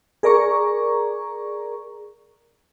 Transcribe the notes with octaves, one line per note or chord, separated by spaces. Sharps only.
G#4 A#4 D5 A#5 C#6